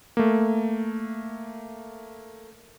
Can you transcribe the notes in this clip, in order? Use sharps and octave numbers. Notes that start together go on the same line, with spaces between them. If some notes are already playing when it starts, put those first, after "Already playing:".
A3 A#3